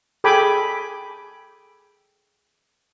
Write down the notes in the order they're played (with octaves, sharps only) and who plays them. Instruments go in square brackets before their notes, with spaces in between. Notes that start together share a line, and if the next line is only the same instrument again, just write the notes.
[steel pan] G#4 A4 G5 G#5 B5 D6